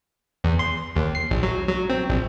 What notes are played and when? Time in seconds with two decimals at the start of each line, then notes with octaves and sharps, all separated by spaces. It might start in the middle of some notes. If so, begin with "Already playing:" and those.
0.44 E2
0.59 C6
0.96 D#2
1.15 C7
1.31 A#1
1.43 F#3
1.68 F#3
1.89 C4
2.09 A#1